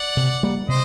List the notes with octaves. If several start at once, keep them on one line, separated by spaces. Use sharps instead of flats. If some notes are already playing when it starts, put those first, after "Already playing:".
Already playing: D5 F#5
C3
G3 A#3
C3 C5 D#5